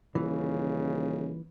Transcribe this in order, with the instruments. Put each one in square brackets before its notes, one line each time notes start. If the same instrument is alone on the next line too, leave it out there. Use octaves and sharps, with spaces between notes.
[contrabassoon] D#1 [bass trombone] C#3 [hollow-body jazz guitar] E3